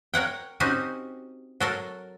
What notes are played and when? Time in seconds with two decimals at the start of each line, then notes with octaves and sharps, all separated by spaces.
0.14 A#4 C#5 F#5 G5
0.60 C4 C#4 D#4 F#4 G4
1.60 F#3 A4 A#4